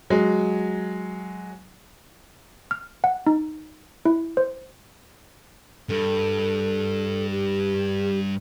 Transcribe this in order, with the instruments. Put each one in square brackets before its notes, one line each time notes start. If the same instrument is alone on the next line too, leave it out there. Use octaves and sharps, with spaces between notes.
[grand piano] F#3 G#3
[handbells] F6
F#5
D#4
E4
C5
[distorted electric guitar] G2 [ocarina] A4
[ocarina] G4